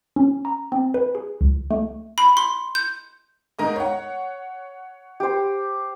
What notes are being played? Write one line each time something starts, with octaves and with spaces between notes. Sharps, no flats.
C#4
A#5
C4
B4
G#4
C#2
A3
B5
C6
G6
G#2 A#4 D#5
C#5 F#5
G4 C5